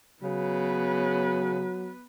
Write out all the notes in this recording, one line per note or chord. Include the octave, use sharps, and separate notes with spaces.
C#3 F#3 B3 B4